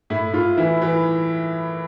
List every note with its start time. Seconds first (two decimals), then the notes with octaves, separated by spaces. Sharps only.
0.10 A2 E4
0.33 A2 F4
0.57 E3 E4
0.82 E3